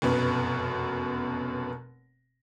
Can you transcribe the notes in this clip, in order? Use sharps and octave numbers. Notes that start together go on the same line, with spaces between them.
F1 F#2 B2 B4